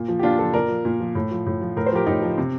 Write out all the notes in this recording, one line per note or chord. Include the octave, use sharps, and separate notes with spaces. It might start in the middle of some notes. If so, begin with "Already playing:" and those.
Already playing: A#2
F3
G4
A#2 D4 F4
F3 F4 A4
A#2 A#4 D5
F3
A#2
F3
A2
F3
A2
F3
A2 A#4
C5
F3 G4 A#4
A2 D#4 G4
F3
C3